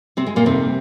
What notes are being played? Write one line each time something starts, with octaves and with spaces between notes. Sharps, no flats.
C3 C4
G#3
A#2 A#3
F2 C3 D#3 G3 C4